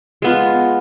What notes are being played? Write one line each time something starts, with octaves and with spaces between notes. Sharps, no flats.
G#3 B3 F4